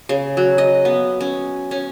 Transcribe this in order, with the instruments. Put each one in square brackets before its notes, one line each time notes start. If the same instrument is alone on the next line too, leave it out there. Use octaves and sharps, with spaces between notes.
[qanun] C#3
F#3
D#5
B3
C#4
C#4